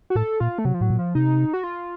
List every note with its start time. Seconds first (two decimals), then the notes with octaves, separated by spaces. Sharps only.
0.10 F#4
0.15 A2 A4
0.40 A#2 F4
0.58 A3
0.65 C3 F#3
0.74 F3
0.81 A2 F#3
0.90 A#2
0.99 F3
1.15 C3 D#4
1.53 F#4
1.64 F4